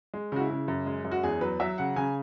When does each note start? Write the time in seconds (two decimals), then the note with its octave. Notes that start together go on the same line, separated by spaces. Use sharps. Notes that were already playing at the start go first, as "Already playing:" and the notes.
0.14 G#3
0.32 C#3 F#4
0.40 E4
0.50 C#3
0.68 F#2
0.86 G#3
1.04 F#2
1.12 F#4
1.23 E2 G#4
1.41 F#3 B4
1.60 F#3 E5
1.78 C#3 F#5
1.96 C#3 G#5